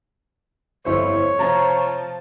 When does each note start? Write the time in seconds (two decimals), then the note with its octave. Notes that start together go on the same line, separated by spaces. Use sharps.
0.85 G1 F2 E4 C5 C#5
1.39 C3 F3 A5 A#5